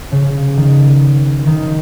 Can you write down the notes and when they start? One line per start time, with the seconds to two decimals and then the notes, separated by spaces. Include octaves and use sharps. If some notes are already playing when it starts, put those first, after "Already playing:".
0.12 C#3
0.57 D#3
1.47 D#3